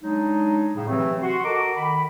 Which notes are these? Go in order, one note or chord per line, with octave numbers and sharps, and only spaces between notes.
F#3 G#3 D4 D#4
A2 C#3
C3 E3 F#3 A3 C4
F#4 C6
F#4 A4 A#4 D#5 A#5 D6
D#3 B5